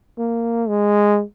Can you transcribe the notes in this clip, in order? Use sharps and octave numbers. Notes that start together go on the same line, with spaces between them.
A#3
G#3